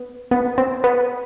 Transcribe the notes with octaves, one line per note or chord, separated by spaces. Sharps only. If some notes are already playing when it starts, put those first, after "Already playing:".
Already playing: B3
B3
C4
B3